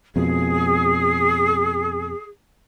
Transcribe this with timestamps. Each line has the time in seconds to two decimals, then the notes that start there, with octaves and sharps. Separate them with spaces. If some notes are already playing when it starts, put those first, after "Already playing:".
0.16 F2 B2 G#4